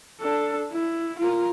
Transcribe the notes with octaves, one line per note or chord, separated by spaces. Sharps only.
D4 A4
E4
F4 A#4